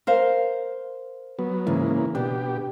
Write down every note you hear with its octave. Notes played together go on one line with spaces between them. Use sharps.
A#4 C5 F5
F#3 B3
G#2 C#3 E3 A#3
B2 D4 G4